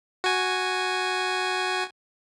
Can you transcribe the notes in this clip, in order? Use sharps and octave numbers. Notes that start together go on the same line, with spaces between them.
F#4 G#5